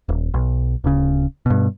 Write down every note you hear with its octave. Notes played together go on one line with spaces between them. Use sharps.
D#1
B1
D1 C#3
G2 B2